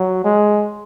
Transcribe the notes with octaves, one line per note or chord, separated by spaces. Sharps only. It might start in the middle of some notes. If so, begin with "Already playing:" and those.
Already playing: F#3
G#3